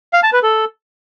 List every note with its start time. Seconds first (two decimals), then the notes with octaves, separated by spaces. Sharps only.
0.13 F5
0.23 A5
0.33 B4
0.43 A4